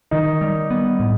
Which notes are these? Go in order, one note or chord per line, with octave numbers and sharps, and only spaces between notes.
D#3 D#4
G3
B3
A2